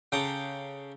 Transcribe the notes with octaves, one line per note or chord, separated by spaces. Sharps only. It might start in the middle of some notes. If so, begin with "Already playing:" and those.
C#3 A4 G5 A#5 D6